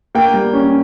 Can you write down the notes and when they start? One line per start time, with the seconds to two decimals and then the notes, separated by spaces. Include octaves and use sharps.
0.15 A#3 G5
0.34 G3
0.53 C#4